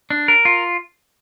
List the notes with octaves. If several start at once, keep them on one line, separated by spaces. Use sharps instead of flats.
D4
A#4
F4